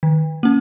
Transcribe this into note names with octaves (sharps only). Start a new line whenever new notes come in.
D#3
A#3 C#4